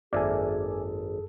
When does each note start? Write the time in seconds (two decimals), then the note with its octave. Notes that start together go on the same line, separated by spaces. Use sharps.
0.13 G#1 F#2 A#3 G#4 A4 D5 E5 G#5